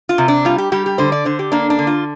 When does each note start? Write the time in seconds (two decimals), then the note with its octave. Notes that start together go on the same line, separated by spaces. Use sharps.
0.09 F4
0.18 C3
0.28 D4
0.45 G3 F4
0.58 G4
0.72 G3 G4
0.86 G4
0.98 D3 C5
1.12 D5
1.25 D3 C5
1.39 G4
1.52 A#3 D4
1.70 D4
1.79 D3
1.87 F4